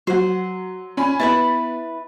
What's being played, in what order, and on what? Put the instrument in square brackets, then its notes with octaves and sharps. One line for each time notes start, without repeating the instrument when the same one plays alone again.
[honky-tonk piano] F#3 [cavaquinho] C5 F#5
[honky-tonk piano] C#4 G#5 B5
[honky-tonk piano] B3 A6 [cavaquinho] E4 B4 B5